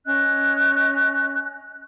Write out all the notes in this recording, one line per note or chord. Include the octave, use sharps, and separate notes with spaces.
C#4 D#5 F#6